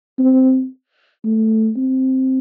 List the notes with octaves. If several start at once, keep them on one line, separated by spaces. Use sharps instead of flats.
C4
A3
C4